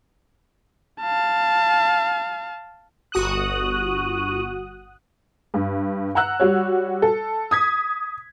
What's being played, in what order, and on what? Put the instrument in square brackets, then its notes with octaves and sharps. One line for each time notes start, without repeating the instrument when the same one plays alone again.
[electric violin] F5 A5
[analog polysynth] G1 F#4 D#6 F#6
[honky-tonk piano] G2
F#5 A#5 E6 F#6
G3 F#4 C#5
A4
D#6 G#6 B6